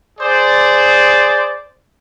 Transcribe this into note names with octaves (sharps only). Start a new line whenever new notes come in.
G#4 C5 D5